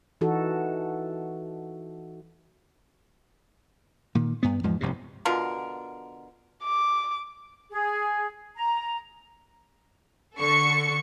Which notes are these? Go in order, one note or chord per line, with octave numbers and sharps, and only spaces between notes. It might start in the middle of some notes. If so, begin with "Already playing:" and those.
E3 D#4 F#4 A4
A#2 D#3
G2 B3
E2 G#2 F3 G#3
F1 C2 G2 C3
B2 D3 F4 A#4
D6
G#4
A#5
D3 A4 C#6 C#7